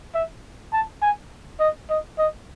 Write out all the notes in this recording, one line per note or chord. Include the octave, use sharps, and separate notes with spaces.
E5
A5
G#5
D#5
D#5
D#5